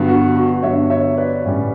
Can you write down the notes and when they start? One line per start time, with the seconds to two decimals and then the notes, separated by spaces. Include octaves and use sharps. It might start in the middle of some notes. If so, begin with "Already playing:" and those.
Already playing: G2 D3 F#3 B3
0.08 F#4
0.36 F#4
0.62 G2 D3 F#3 B3 C#5 E5
0.90 C#5 E5
1.18 B4 D5
1.45 A1 A2 G3 C#4